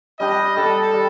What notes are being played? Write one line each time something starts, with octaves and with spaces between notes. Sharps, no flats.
G3 D4 G4 D#5
G3 D4 G4 A4
G3